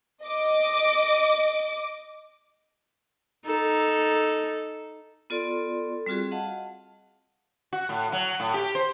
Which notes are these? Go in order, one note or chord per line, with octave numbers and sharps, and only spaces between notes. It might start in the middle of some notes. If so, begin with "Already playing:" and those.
D#5 D6
D#4 A4
B3 F4 A4 D5 C6
G3 C4 F4 F#4 G#4
D#5 F5 F#5 A5
F#4
A2
F#3
A2
G4
C5